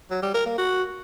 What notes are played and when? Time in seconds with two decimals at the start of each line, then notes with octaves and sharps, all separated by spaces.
0.10 F#3
0.22 G3
0.34 A#4
0.46 A#3
0.58 F#4